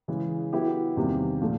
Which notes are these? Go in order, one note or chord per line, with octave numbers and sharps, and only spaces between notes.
C#3 E3 G#3
F#3 B3 E4 G4
E2 C3 D#3 G3 A#3
A#2 F3 A3